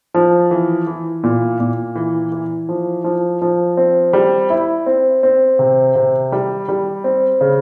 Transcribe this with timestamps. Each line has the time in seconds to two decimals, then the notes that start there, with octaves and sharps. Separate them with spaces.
0.14 F3
0.51 E3
0.87 E3
1.24 A#2
1.60 A#2
1.96 E3
2.32 E3
2.69 F3
3.04 F3
3.42 F3
3.77 C4
4.13 G3
4.50 E4
4.86 C4
5.23 C4
5.59 C3
5.95 C3
6.32 G3
6.68 G3
7.04 C4
7.41 C#3